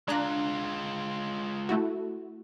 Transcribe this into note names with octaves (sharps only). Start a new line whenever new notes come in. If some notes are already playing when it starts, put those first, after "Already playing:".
G#3 D4 F4 A#5 F#6
A3 E4 F#4